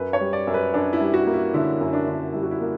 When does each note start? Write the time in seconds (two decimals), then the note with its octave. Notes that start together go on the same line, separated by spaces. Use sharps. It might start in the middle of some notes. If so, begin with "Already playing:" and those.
Already playing: F#2 B4
0.13 C#5
0.20 G3
0.33 D5
0.47 F#2
0.54 B4
0.74 F#2 D4
0.93 E4
1.00 G3
1.14 F#4
1.27 A#3
1.34 E4
1.54 D3 E4
1.81 F#2
1.93 D4
2.07 D3
2.33 G3 E4
2.43 F#4
2.51 E4
2.61 A#3